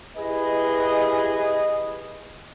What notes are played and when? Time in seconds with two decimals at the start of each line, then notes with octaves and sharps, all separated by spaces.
0.17 E4 G4 G#4 B4 D#5